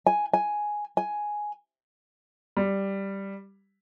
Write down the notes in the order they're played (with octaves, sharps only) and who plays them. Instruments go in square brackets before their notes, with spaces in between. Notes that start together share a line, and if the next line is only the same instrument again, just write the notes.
[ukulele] G#5
G#5
G#5
[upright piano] G3